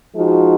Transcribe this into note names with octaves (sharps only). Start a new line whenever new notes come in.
F3 G#3 D#4 F#4